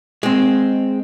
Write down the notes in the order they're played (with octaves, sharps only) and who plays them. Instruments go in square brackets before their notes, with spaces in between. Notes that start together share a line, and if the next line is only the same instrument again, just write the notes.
[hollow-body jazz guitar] G#3 C4